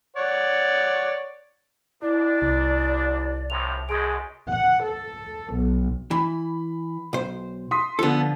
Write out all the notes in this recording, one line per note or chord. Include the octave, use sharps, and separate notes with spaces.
C#5 D5 F#5
D#2 D4 E4 D5
C2
A#1 A2 C3 F7
F#2 B2 G#3 G#4 G#5 D7
F#5
A4
B1
E3 B5
B1 C5
C6 D#6 B6
D3 F3 B3 A4 E6